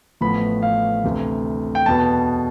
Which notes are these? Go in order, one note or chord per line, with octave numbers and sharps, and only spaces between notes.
A1 A2 F3 B3 B5
F5
D2 C3 E3
G5
E2 B2 B3 A5